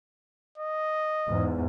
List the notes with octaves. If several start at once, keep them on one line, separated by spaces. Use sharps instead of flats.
D#5
E2 G#2